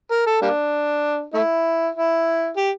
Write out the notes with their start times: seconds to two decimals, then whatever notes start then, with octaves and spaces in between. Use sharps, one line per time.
0.11 A#4
0.27 A4
0.42 G3 A#3 D4
1.34 A3 E4
1.95 E4
2.56 G4